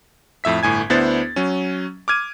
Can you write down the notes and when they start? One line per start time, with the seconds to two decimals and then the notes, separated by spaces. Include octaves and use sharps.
0.44 F2 A2 E5 B6
0.63 G1 A2 G#5 G#6
0.90 D2 B3 D4 E4 C5 A6
1.36 F#3 C#4
2.08 D6 F6 G#6 D#7